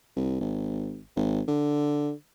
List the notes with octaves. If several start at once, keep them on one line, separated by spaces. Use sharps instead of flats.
C2
G#1
G#1
D3